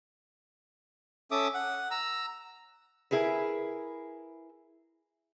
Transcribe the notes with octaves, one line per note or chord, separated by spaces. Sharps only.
C#4 A4 E5 D6 D#6
F#5
A#5 E6
E4 G#4 A#4 B4